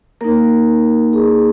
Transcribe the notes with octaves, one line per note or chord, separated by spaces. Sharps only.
A#3 D#4 A#4
G#4